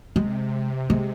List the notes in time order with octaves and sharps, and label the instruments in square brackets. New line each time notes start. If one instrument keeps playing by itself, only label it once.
[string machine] C3 [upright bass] G#3
[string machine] C3
[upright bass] G#3